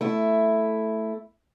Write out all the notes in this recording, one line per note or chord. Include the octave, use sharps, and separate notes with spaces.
A3 E4